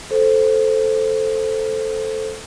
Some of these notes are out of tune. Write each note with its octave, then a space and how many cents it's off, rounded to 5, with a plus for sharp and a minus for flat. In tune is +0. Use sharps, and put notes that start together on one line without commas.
A4 +0 C5 +0